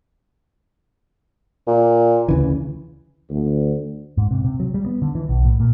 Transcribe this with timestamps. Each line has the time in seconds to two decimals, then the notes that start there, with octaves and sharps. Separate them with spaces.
1.67 A#2
2.28 D2 C#3 E3
3.30 D2
4.17 G#2
4.31 C3
4.44 C3
4.60 F#3
4.74 G3
4.86 B3
5.02 D3
5.15 E3
5.29 B1
5.45 A2
5.60 A#2